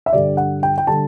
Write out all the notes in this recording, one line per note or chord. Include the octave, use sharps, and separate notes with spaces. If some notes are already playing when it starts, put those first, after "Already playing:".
E5
G2 D3 G3 D5
F#5
G5
G5
D3 G3 A5